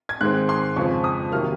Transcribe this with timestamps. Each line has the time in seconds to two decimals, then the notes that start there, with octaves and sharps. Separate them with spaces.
0.09 G#6
0.21 G#2 D#3 G#3 C4 F#6
0.49 C6
0.76 F2 C#3 G#3 C4 C#6
1.04 D#6
1.31 C3 D#3 F#3 A#3 F6